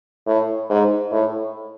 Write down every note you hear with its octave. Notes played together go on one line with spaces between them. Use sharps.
A2
G#2
A2